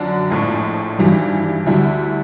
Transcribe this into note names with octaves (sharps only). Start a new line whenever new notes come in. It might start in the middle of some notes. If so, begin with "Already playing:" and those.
Already playing: F#2 D3 F3 D4
A#1 A2 F3 G#3
G#1 G2 E3 G3
D2 D3 G3 E4